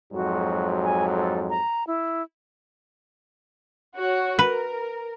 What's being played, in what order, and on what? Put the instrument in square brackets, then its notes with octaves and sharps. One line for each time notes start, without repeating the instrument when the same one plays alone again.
[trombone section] F2 G#2 F#3 [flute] F#4
[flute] G#5
A4
A#5
E4
[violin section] F#4 C#5
[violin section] A#4 [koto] B4